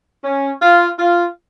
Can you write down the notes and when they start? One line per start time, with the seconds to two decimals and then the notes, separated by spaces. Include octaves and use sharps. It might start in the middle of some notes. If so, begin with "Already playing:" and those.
0.23 C#4
0.61 F4
0.98 F4